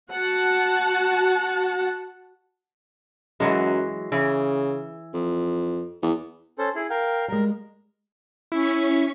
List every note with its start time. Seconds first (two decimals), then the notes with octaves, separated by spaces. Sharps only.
0.11 F#4 F#5 A5
3.40 F#2 E3 F#3 G#3
4.12 C#3 E3
5.14 F2
6.02 E2
6.59 C#4 A4 C5
6.75 E4 G#4
6.90 A#4 F5 G5
7.28 G3 G#3 A#4
8.52 C#4 E4 C#6 B6